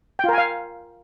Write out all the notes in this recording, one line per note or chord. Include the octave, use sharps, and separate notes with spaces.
F4 A#4 F5 G5 G#5